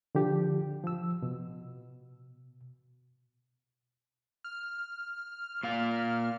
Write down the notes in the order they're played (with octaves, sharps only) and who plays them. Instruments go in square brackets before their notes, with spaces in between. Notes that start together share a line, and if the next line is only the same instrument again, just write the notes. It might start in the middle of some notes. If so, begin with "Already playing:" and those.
[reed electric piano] D3 F3 G4
F3 E6
B2
[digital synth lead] F6
[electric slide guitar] A#2 F5